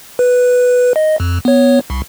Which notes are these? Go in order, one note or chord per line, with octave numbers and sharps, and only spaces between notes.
B4
D#5
F2
B3 C#5
C2